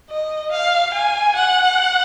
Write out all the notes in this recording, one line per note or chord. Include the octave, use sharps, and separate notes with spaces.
D#5
F5
G#5
F#5